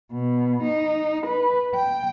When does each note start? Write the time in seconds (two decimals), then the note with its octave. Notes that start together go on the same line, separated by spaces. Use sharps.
0.12 B2
0.63 D#4
1.27 B4
1.75 G5